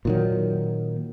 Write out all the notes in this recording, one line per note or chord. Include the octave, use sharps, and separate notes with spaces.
A#2 D#3 F#3